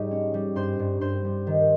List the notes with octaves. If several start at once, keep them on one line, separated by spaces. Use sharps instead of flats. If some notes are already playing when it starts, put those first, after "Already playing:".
Already playing: G#2 G3 D#4 C#5 D#5
C#4
G3
G2 C5 C6
G2
G2 C5 C6
G3
D#3